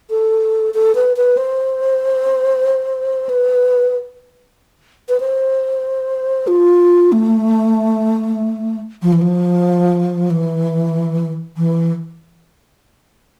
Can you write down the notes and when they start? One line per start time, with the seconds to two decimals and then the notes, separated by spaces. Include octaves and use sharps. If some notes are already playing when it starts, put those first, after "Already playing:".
0.10 A4
0.74 A4
0.95 B4
1.17 B4
1.37 C5
3.29 B4
5.09 B4
5.20 C5
6.47 F4
7.12 A3
9.02 F3
9.13 E3
9.21 F3
10.30 E3
11.57 E3